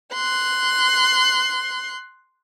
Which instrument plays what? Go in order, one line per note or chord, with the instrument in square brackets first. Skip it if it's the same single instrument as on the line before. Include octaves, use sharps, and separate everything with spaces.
[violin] C6 F#6